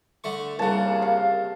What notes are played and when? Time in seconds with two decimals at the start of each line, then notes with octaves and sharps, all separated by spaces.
0.24 D3 A3 C#6
0.59 C2 C#3 A#3 F#5 A5
1.02 F5